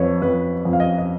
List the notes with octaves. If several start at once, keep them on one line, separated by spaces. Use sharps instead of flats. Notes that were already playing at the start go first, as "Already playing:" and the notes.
Already playing: F2 B4 C#5
F2 B4
F2
F5
D#5
D#5